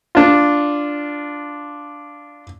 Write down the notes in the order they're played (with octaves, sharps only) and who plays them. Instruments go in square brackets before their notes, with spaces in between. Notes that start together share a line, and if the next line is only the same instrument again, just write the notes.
[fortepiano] D4 F4